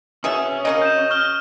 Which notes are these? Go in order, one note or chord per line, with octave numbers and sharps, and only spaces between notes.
B2 C#4 G#4 E5 D#6
C#3 A#3 F#4 D#5
G6 E7
C#6 F6 G7